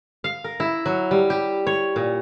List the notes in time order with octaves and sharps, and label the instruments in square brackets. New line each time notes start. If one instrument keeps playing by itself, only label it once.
[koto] F5
A#4
E4
F#3
G3
G4
C#5
A#2